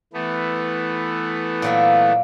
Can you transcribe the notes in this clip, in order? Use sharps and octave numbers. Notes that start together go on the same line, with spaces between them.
E3 A3 B3
A#2 F#3 A#3